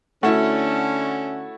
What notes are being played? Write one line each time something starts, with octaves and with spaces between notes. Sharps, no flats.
D3 A3 C#4 E4 F#4